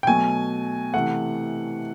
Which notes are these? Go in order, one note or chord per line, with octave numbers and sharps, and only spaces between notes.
G5
B2 F#3 A3 G#5
C3 E3 A3 F#5